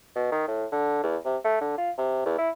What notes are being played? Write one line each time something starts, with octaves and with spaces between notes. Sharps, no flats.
B2
D#3
A2
D3
E2
C3
A3
D3
F4
C3
E2
E4